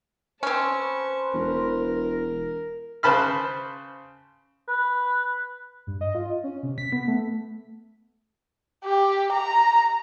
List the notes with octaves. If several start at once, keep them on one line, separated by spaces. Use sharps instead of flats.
C4 C#4 B4 C5 A5 C#6
E1 A#4
C#3 B4 C5 A5 B5 F6
B4
G2
D#5
F4
C#4
C3
B6
B3
A3
G4
A#5